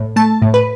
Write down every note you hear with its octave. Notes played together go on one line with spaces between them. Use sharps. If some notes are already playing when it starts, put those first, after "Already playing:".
Already playing: A2
A3 A5
A2
B4